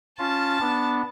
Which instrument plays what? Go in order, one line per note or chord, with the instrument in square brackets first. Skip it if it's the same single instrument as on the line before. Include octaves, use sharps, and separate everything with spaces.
[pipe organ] C#4 F4 [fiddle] A5
[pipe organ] B3 D4